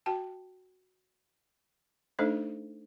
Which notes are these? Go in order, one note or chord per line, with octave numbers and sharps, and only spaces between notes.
F#4 G5 A5
A3 D4 D#4 A4 C5 D#5